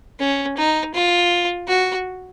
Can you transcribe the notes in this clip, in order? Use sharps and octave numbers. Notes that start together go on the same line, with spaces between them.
C#4
D#4
F4
F#4